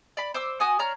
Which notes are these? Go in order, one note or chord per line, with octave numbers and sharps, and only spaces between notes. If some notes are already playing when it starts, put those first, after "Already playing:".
D5 B5
C5 D6 E6
F#4 G#5 D#6
D4 C#5 A#5 F6